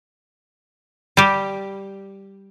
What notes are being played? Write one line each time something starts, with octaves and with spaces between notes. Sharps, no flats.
G3 G4